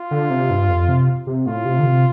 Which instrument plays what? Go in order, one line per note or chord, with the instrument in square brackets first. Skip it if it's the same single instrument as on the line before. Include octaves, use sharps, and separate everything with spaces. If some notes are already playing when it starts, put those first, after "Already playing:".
Already playing: [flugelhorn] F4
[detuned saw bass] D3
C3
G2
F2
C3
C3
[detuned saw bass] A2 [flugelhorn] F4
[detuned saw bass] C3
D3
C3